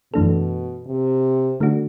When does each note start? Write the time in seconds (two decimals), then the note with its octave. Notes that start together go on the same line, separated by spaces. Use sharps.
0.13 F#2 B2 E3 A3 D4 A4
0.87 C3
1.60 D3 A3 D4 F#4